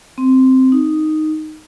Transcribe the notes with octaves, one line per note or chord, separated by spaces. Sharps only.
C4
D#4